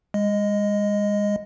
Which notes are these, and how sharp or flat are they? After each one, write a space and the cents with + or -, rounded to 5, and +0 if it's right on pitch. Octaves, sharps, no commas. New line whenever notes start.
G#3 -30 D#5 +0